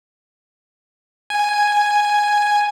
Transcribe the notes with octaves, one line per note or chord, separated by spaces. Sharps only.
G#5